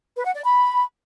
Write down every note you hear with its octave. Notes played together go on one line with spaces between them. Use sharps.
B4
F#5
D5
B5